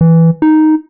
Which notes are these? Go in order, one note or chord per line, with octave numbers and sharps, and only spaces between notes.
E3
D#4